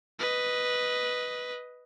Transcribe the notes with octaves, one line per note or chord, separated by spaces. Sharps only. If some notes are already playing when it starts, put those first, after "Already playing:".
B4 D#5